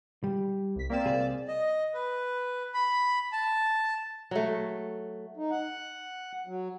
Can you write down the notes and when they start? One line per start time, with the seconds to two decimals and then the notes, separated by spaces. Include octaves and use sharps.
0.24 G3
0.76 C2 B6
0.90 A#3 C4 D5 E7
1.06 C2 G#4
1.48 D#5
1.94 B4
2.74 B5
3.32 A5
4.31 F#3 A3
5.37 D#4
5.51 F#5
6.47 F#3